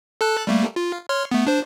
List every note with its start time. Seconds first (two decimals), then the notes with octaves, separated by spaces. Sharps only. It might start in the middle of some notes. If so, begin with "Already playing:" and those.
0.21 A4 A5 F#6
0.47 G3 A3 A#3
0.76 F4
1.09 C#5 C6 F6
1.31 A3 B3
1.47 D4 C5